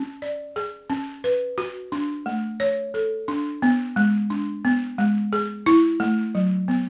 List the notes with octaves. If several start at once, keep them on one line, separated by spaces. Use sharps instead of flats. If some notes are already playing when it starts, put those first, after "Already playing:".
Already playing: C#4
D5
G#4
C#4
B4
F#4
D4
A3
C#5
A4
D4
B3
G#3
D4
B3
G#3
G#4
E4
A3
F#3
B3